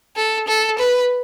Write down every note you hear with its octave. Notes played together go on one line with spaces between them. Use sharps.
A4
A4
B4